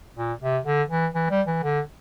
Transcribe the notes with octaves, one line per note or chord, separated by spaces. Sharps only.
A#2
C3
D3
E3
E3
G3
E3
D3